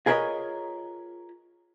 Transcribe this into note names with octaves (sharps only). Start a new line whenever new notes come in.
F4 G#4 A#4 B4 C#5 D#5